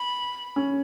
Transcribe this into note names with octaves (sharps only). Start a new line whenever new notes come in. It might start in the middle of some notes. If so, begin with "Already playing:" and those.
Already playing: B5
C#4